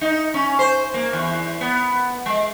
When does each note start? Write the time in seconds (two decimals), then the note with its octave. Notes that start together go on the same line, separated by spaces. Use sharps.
0.01 D#4
0.34 C#4
0.59 C5
0.94 A#3
1.13 E2
1.61 B3
2.26 G#3